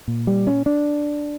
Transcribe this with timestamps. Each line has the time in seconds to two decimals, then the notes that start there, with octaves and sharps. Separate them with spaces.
0.08 A#2
0.27 G3
0.47 C#4
0.66 D4